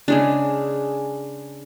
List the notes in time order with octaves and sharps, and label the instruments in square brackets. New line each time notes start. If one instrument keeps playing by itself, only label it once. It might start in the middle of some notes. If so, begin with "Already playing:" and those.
[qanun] C#3 G#3 D4